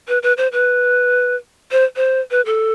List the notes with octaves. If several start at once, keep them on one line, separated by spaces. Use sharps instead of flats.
B4
B4
C5
B4
C5
C5
B4
A4